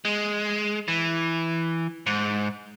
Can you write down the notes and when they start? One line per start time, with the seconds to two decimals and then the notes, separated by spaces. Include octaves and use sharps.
0.05 G#3
0.88 E3
2.06 G#2